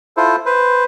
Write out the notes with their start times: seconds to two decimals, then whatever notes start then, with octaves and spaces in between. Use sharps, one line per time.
0.17 E4 F4 A4 C5
0.46 B4 C5